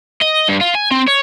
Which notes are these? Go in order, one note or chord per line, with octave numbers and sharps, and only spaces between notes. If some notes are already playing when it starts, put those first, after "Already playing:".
D#5
G2
F4
G#5
C4
C#5